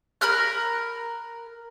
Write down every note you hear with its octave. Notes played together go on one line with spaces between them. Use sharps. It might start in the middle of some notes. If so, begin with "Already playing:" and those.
A#4 B5 F6 F#6